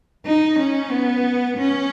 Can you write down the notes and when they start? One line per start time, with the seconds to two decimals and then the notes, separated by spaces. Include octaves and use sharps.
0.26 D#4
0.59 C#4
0.91 B3
1.58 C#4